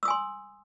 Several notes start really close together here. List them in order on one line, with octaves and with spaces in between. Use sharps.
E6 D#6 G#5 C6